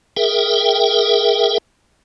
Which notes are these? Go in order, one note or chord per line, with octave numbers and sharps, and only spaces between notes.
G#4 A#4 E5 G5